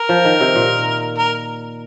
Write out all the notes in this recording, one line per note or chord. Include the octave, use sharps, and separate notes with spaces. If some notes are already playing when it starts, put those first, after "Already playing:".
Already playing: A#4
F3
D#3
C3
A#2
A#4